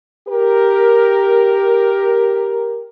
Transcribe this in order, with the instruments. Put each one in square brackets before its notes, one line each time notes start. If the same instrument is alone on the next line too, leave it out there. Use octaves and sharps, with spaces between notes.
[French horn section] G4 A#4